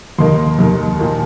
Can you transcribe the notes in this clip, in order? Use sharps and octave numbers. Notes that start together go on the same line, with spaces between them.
D#2 D#3 A#3 C6
D#2 D#3 A#3
A#2 F3 A#3